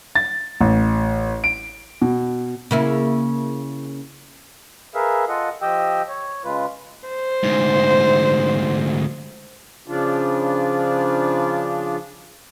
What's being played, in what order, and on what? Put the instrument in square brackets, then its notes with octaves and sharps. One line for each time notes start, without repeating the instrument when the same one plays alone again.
[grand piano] A6
A1
D7
B2
[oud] C#3 A#3 E4
[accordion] G#4 A#4 B4 E5 F5
F4 A4 D#5 F#5
F3 G4 D#5 G5 E6
C#5
C#3 G#3 F4 B4
[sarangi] C5
[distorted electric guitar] D2 G#2
[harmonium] C#3 F3 D4 F4